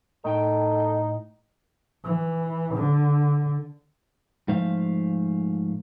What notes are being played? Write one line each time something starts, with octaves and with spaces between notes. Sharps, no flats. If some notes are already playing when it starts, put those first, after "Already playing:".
A2 D#4 A4 G5
E3
D3
G#2 F3 A3 C5 E5 F5